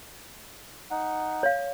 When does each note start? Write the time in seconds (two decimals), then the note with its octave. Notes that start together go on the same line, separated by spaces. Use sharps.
0.91 D#4 F#5
1.43 C#5 F5